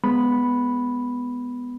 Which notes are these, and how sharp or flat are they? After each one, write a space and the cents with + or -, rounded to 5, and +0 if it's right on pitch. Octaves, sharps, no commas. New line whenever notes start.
G#3 +5 B3 +0 B5 -5